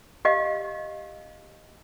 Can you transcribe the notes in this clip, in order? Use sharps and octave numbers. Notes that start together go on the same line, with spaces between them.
G4 D#5 F5